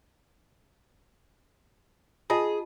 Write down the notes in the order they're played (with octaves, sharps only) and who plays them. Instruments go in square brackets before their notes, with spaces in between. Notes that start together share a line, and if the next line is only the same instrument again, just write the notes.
[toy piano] F4 D#5 A5 [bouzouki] G#4